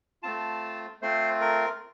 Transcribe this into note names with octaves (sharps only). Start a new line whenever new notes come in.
A3 C4 F4 A5
A3 C4 F4 C5
A#4